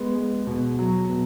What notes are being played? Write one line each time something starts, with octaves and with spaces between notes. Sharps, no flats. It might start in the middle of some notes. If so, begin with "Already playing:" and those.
Already playing: G#3 B3
G#3
B2
F#3
B2